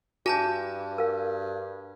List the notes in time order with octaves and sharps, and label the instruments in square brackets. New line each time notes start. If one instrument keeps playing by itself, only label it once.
[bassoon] G2 [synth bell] F#4 [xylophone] G#5 A5 G6
[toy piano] A#4 F5